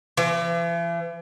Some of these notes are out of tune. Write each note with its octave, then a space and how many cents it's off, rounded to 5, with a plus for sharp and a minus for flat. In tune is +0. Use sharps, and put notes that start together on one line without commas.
E3 +45